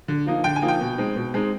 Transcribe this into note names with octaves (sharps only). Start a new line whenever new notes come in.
D3
F3 A#3 D#4
D3 G5
G#5
F3 A#3 D#4
G5
B2
G#3 C4 D#4
B2
G#3 C4 D#4